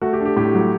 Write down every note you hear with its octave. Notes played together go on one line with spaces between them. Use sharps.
A3 F#4
G4
D4
G4
A2 G4
F#3